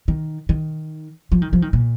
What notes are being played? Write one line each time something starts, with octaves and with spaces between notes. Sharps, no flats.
D#3
D#3
F3
D#3
F3
D#3
A#2